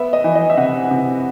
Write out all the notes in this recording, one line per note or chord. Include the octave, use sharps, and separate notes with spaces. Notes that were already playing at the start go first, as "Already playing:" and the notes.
Already playing: B3 E5
D#5
E3
D#5
E5
C3 F#5
C3